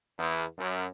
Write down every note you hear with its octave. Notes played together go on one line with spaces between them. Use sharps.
E2
F#2